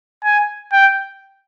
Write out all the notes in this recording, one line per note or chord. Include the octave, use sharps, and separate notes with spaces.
G#5
G5